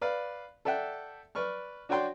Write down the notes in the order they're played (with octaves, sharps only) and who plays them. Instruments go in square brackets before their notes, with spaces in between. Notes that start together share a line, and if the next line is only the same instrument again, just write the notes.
[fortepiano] B4 D5 F5
A4 D5 E5 F#5 G5
B4 D5 C#6 F6
D4 F#4 C#5 D5 G5 C6